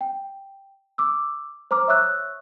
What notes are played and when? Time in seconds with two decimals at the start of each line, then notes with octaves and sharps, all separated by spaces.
0.01 G5
0.98 D6 E6
1.71 C5 A#5 D6 F6
1.88 C#5 E5 C#6 D#6 E6 F#6